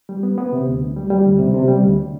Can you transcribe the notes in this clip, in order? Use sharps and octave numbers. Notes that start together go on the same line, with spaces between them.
G3
B3
B3
C3
D2
D2
G3
G3
D2
C3
C3
G3
D2